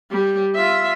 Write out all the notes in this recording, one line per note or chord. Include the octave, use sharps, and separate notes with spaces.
G3
F4 E5